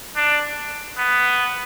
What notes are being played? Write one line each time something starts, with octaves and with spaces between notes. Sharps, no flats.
D4
B3